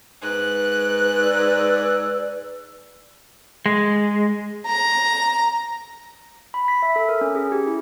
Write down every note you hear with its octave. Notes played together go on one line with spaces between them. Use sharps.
G#2 B4 F#6
D5 E6
G#3
A#5
B5
B6
E5
A4
A#4
C#4
G#4
G4
E4